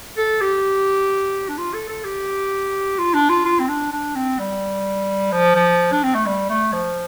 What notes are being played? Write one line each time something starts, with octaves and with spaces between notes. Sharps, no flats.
A4
G4
D4
F4
A4
A4
G4
F4
D4
F4
F4
C4
D4
D4
C4
G3
F3
F3
D4
C4
A3
G3
A3
F3